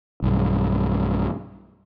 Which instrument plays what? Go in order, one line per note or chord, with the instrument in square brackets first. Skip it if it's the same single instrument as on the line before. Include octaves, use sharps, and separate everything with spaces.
[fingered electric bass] B1 G2